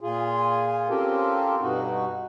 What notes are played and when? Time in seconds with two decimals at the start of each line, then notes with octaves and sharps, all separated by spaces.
0.01 A#2 F4 G#4
0.89 C4 C#4 F4 G4 A4 A#4
1.61 G2 B2 D#4 F#4